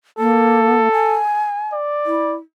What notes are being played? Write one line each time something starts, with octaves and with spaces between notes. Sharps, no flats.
A#3 A4
G#5
D5
E4